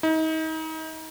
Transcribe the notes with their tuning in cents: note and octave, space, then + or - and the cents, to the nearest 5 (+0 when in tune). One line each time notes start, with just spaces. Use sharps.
D#4 +35